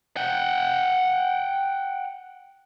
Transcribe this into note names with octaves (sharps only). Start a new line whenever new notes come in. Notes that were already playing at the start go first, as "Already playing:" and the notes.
F#5 G5